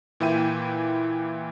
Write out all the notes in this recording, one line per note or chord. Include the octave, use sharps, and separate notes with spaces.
A#2 E3 E4 G5 D#7